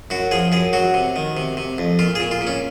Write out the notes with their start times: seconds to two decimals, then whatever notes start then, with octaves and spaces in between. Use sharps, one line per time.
0.10 F#2 F#4
0.31 F3 G#4
0.52 F#2 G#4
0.73 F#3 F#4
0.94 C3
1.16 D#3
1.37 C3
1.57 C3
1.78 F2
1.99 A#2 F4
2.15 A#2 G#4
2.31 F4
2.41 A#2
2.47 C#4